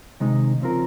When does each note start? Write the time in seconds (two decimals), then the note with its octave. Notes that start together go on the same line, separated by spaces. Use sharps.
0.20 C3 D#3 G#3 D#4
0.60 C#3 F3 C4 F4 A#4